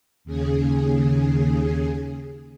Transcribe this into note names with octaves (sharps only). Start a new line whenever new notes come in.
D#2 C#3 G#4